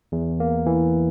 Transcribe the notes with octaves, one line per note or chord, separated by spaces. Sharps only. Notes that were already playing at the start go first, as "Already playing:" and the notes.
E2
A#3
E3